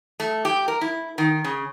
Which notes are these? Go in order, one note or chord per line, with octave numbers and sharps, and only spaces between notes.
A3
G4
A#4
E4
D#3
C#3